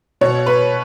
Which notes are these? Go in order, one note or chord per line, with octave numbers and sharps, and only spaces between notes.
B2 C#5
B4